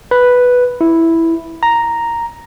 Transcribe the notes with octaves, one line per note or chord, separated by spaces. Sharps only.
B4
E4
A#5